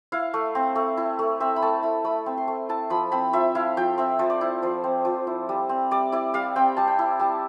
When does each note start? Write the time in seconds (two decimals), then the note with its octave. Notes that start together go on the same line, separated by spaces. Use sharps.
0.12 E4 F5
0.34 A3
0.55 C4
0.75 A3
0.97 E4
1.19 A3
1.40 C4 E5
1.56 B5
1.62 A3 A5
1.83 E4 B5
2.04 A3 B5
2.26 C4
2.37 C6
2.48 A3
2.69 E4 A5
2.90 F3 B5
3.12 C4 B5
3.33 F3 E5
3.55 E4 F5
3.77 F3 G5
3.98 C4 E5
4.19 F3
4.30 D5
4.41 E4
4.62 F3 C5
4.84 C4
5.05 F3
5.27 E4
5.49 G3
5.69 C4
5.91 G3 D5
6.12 E4 D5
6.34 G3 F5
6.56 C4 G5
6.77 G3 A5
6.88 G5
6.99 E4
7.20 G3 A5